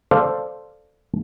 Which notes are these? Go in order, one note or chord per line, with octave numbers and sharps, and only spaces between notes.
A4 C5 D5 F5